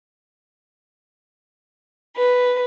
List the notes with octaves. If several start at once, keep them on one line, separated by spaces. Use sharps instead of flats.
B4